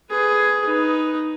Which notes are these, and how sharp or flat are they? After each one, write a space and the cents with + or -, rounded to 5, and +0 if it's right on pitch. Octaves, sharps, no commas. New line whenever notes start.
G#4 +10 B4 +20
D#4 +0 B4 +0